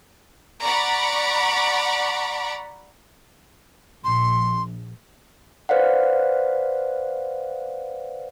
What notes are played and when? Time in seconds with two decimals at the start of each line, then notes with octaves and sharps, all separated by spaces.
0.62 D5 F#5 A#5 B5 C#6 D6
4.04 A#1 C6
5.69 B4 C5 D5 F5 F#5